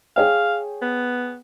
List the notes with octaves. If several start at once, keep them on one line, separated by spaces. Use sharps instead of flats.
G#4 C#5 F5 G5
B3